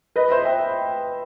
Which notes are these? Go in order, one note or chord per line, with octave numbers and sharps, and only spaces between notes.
B4 D#5
C5 E5
E5 G5